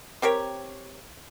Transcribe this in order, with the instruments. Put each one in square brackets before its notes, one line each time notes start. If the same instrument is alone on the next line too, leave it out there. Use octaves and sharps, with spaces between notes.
[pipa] C4 G4 A#4 C#5